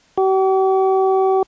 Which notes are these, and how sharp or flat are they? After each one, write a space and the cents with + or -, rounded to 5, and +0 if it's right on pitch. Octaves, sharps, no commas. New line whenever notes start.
G4 -45